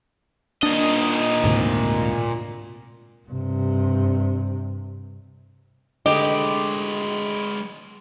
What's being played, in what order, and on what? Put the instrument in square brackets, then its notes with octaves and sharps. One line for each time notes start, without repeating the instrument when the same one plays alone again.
[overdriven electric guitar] A#2 D#5 [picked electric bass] D4
[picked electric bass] D2 G#2 C3
[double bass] G2 C3
[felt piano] D3 A3 [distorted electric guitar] G#3 B4 [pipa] G4 [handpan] D#5